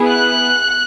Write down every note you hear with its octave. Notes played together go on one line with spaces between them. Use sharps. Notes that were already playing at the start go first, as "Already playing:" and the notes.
Already playing: B3 E4 G#4
F#6